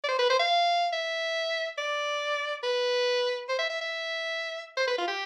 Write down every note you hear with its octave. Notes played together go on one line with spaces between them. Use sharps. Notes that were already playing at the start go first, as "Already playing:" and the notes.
D5
C5
B4
C5
F5
E5
D5
B4
C5
E5
E5
E5
C5
B4
F4
G4